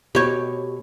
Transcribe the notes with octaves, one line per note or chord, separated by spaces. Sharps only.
B2 G4 C#5